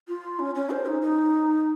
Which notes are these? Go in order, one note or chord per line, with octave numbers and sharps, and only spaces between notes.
F4
C#4
C#4
C5
D#4
D#4